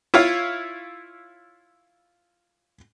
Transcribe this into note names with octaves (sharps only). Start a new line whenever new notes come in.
E4 F4 C#5 F5